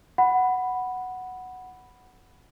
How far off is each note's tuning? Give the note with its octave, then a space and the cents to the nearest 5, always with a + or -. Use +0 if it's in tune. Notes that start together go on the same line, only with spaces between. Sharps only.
F#5 +0 B5 +0